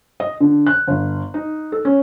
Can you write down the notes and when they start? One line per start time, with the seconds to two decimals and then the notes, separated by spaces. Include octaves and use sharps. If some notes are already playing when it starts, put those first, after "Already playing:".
0.20 D#5
0.40 D3
0.67 F#6
0.88 G1
1.34 D#4
1.72 A4
1.85 C#4